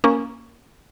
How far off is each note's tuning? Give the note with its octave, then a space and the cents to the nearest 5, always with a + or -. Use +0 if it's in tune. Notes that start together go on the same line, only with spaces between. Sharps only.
A#3 +0 C#4 +5